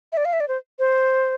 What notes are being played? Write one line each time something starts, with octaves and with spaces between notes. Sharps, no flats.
E5
D5
F5
E5
D5
C5
C5